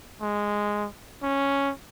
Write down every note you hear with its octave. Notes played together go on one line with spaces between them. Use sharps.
G#3
C#4